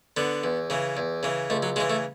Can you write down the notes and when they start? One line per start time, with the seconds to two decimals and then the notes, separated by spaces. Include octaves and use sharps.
0.17 D3 B3
0.44 E2
0.70 C#3 E3
0.97 E2
1.23 C#3 E3
1.50 C#2 A3
1.63 F#3
1.76 C#3 E3 G#3
1.90 A3